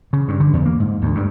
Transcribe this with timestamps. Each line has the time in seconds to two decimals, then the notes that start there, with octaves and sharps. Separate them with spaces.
0.13 C#3
0.28 G2
0.40 D3
0.53 E2
0.66 A#3
0.80 G#2
1.02 D2
1.15 G2